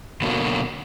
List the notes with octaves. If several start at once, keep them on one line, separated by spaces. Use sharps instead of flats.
B2 D3 F#3 A#3